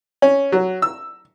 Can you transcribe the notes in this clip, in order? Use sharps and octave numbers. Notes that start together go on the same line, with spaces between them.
C#4
F#3
E6